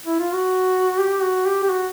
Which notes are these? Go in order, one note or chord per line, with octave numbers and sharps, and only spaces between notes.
E4
F4
F#4
G4
F#4
G4
G4
F#4